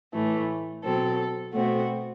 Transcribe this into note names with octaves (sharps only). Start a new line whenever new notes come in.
A2 E3 A3
B2 F#3 C4 A4
B2 A3 C4 F#4